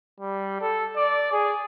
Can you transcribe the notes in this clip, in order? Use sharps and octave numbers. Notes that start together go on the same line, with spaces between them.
G3
A4
D5
G#4